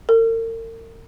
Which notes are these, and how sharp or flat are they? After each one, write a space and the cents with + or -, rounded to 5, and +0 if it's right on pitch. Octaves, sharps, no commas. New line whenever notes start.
A#4 -45